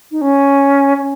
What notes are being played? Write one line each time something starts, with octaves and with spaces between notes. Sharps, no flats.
D#4
C#4
C#4